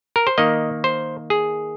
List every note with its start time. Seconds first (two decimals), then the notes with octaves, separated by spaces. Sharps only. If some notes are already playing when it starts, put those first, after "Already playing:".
0.16 A#4
0.27 C5
0.38 D#3 A#3 D#5
0.84 C5
1.30 G#4